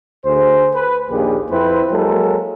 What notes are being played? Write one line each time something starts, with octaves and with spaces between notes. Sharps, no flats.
D2 G#4 C5
B4
A#1 D#2 A#2 G4 G#4
F2 C4 E4 B4 C5
F#3 G#3 A#3 A4 A#4